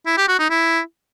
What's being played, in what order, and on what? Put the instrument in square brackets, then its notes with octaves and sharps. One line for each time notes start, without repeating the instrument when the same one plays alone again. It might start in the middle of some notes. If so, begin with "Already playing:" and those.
[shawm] E4
G4
F#4
D#4
E4